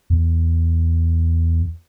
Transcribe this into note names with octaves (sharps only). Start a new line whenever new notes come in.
E2